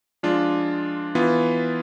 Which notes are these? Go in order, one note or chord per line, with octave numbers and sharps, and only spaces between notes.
F3 G#3 D4 F4
E3 B3 F4